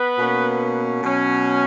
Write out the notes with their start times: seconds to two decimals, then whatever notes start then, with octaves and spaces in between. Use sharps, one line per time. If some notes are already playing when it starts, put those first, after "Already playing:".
Already playing: B3 B4
0.17 B2 A#3 C#4
1.02 B2 F#3 C#4